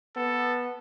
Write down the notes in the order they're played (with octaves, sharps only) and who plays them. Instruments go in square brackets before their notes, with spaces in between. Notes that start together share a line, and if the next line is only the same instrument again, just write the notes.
[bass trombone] B3 [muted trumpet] A4